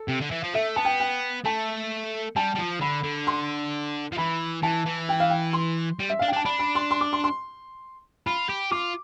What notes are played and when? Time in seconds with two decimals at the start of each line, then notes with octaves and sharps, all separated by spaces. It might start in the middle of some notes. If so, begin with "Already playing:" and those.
Already playing: A4
0.08 C3
0.21 D3
0.31 E3
0.43 F3
0.54 A3 E5
0.76 B3 A5
0.85 G5
1.00 G5
1.45 A3 A5
2.36 G3 A5
2.55 G3
2.59 F3
2.81 D3 B5
3.03 D3
3.27 C6
4.12 F3
4.18 E3 B5
4.62 E3 A5
4.86 E3
5.09 G5
5.20 F5
5.30 G5
5.53 C6
5.99 G3
6.10 E5
6.19 D4 F5
6.28 G5
6.33 D4
6.36 A5
6.45 D4 B5
6.59 B5
6.75 C6
6.91 C6
7.01 D6
7.13 C6
7.24 C6
8.26 F4 B5
8.49 G4
8.72 F4 D6